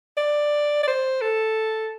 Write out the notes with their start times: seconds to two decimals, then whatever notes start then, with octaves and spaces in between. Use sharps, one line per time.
0.17 D5
0.83 D5
0.87 C5
1.21 A4